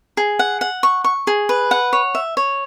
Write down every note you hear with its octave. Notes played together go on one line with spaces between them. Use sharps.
G#4
F#5
F#5
C#6
C#6
G#4
B4
F#5
C#5
E5
C#5